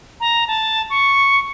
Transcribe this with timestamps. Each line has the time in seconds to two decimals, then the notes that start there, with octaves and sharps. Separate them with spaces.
0.20 A#5
0.48 A5
0.90 C#6